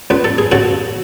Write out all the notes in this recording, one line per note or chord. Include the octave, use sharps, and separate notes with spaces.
C#2 B4
A4
G#4
C#3 F#4 A4